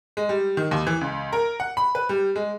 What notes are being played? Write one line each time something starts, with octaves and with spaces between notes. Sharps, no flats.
G#3
G3
D#3
D#2
E3
C#2
A#4
F#5
B5
B4
G3
G#3